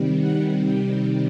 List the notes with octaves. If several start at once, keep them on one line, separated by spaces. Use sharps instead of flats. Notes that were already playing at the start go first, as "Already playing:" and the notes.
Already playing: C3 D#3 G3
F#5
G5